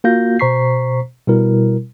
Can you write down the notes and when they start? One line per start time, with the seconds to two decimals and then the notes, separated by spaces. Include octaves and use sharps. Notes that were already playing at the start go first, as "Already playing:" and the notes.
0.04 A#3 F4 F#4 F5 G6 A#6
0.39 B2 C5 A#5 C#6 B6 C7
1.27 B2 G3 E4 A#4